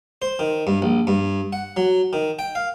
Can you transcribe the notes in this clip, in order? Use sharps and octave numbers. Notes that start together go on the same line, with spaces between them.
C5
D#3
G2
A#1
G2
F#5
F#3
D#3
G5
F5